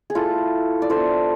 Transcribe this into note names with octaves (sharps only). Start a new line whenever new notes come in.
G#4
A3 E4 F4 A4
D5
B3 D4 F4 A4 C5